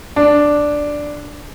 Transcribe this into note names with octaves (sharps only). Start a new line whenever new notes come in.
D4